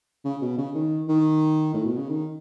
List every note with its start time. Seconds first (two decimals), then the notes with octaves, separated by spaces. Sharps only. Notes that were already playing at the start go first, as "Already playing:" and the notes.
0.24 C#3
0.42 B2
0.58 C#3
0.75 D#3
1.08 D#3
1.74 A2
1.85 B2
1.97 C#3
2.09 D#3